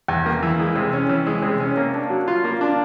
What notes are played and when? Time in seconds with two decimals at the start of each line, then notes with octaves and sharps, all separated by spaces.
0.08 E2
0.26 A#3
0.43 E3
0.59 G#3
0.75 C3
0.93 C#4
1.09 E3
1.27 G#3
1.42 C3
1.60 C#4
1.77 A#3
1.94 D4
2.10 F#3
2.28 F4
2.44 A#3
2.61 D4